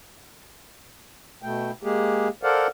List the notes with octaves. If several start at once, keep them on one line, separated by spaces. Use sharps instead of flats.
B2 A3 G5
G#3 A#3 G4 G#4
A4 A#4 C5 D5 F5 F#5